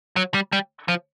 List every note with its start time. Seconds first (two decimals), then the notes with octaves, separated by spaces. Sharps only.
0.16 F#3
0.34 G3
0.52 G3
0.88 F3